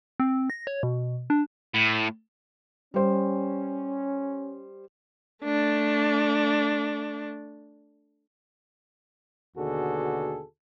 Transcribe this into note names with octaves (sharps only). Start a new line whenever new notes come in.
C4
A#6
C#5
B2
D4
A2
G3 C#4 C5
A3 D4
D#2 B2 D3 F#4 G#4 A4